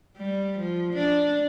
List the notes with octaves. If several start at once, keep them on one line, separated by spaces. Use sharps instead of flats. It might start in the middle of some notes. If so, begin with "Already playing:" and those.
G3
F3
D4